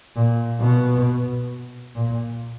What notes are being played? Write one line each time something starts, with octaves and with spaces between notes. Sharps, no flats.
A#2
B2
A#2